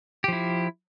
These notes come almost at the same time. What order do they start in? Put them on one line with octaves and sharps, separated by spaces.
G4 F3 E4